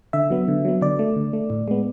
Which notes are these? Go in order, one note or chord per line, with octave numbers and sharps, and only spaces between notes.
D3 E5
F#3 B3
D3
F#3 B3
D3 D5
A3
D3
A3
A2
G#3 B3